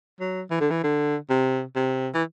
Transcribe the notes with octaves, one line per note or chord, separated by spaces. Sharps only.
F#3
E3
D3
E3
D3
C3
C3
E3